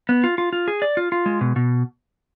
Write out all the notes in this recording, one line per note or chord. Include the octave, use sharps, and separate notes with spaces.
B3
F4
F4
F4
G#4
D5
F4
F4
G#3
B2
B2